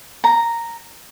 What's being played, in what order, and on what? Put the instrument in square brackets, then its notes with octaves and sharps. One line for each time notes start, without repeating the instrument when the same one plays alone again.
[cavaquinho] A#5